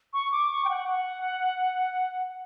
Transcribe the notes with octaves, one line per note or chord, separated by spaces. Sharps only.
C#6
D6
C#6
G5
F#5
F#5